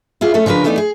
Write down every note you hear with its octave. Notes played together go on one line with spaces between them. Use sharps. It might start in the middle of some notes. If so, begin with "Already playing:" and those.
E4 F4 G#4
A3 C#4 A4 C#5
C#3 F3 D4 A#4 B4
E3 A3 B3 D#4 C5 D5
G#4